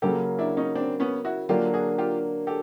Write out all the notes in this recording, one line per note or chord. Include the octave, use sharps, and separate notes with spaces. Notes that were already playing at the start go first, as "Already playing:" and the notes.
C#3 F#3 A#3 G4 A4
D4 E4
C#4 D#4
C4 D4
B3 C#4
E4 F#4
D3 F#3 A#3 D4 F4 G4
F#4 G#4
F4 G4
G4 A4